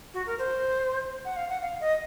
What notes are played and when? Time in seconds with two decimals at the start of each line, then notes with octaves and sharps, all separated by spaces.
0.14 F#4
0.27 A#4
0.39 C5
1.25 F#5
1.36 F5
1.49 F#5
1.62 F5
1.81 D#5